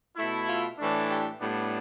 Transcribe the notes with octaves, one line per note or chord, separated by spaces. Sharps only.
B2 A3 E4
F4
A2 E3 A3 D4
G4
A2 G3 B3 D4